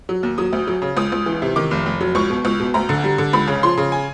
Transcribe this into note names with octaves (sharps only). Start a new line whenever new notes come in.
F#3
D#2
F#3 D#6
D2
F#3
C#3
C#2 D#6
C#2
E3
C3
D#3 D6
F1
F1
F#3
C#2 C#6
B2
C#2
B2
D2 A#5
D3
G3
D3
C#2 B5
C#3
F3 C6
C#3
G#5